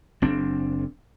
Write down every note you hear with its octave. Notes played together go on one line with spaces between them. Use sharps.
F#1 C4 D4